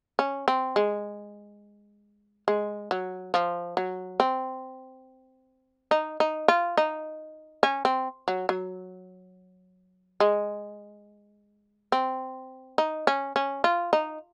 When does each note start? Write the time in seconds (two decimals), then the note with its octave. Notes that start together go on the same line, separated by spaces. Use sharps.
0.19 C#4
0.48 C4
0.76 G#3
2.48 G#3
2.91 F#3
3.34 F3
3.77 F#3
4.20 C4
5.91 D#4
6.20 D#4
6.48 F4
6.77 D#4
7.63 C#4
7.85 C4
8.28 F#3
8.49 F#3
10.20 G#3
11.92 C4
12.78 D#4
13.07 C#4
13.36 C#4
13.64 F4
13.93 D#4